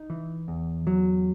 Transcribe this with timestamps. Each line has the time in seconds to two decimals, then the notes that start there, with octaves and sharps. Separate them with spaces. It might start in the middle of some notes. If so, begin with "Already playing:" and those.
Already playing: D#4
0.10 E3
0.48 E2
0.87 F#3